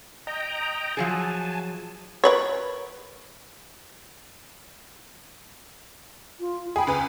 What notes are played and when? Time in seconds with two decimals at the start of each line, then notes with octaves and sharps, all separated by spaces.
0.27 D#5 G5 A#5
0.97 F3 F#3 G#4 G#5 A5
2.24 A#4 B4 C#5
6.40 F4
6.76 G#4 G5 B5
6.87 C#2 B4 G#5